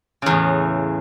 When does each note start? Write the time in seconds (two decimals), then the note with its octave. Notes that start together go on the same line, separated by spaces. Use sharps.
0.22 C#3
0.26 E2
0.30 A2